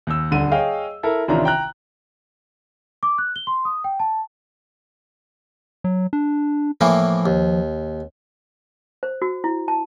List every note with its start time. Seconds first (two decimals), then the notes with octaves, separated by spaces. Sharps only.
0.07 D#2 E6
0.31 D#1 D3 D#7
0.51 G#4 C#5 D#5 F5 G5
1.03 E4 A4 A#4
1.28 A1 C3 D#3 D4 F4 A#5
1.45 G5 A#5 F#6
3.03 D6
3.18 F#6
3.36 G7
3.47 C6
3.65 D#6
3.84 G5
4.00 A5
5.84 F#3
6.13 D4
6.81 A2 E3 F3 A#3
7.26 D#2
9.03 C5
9.22 F#4
9.44 E4
9.68 A5